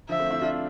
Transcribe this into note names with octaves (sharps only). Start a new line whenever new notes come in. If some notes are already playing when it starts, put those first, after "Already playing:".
D3 F3 E5
A3 C4
C4 E4
D4 F4